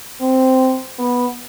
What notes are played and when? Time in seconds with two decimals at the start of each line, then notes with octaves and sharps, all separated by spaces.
0.21 C4
0.99 B3